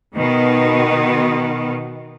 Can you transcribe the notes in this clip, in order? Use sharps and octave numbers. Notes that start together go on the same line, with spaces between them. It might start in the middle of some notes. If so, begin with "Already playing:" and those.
B2 D#3 B3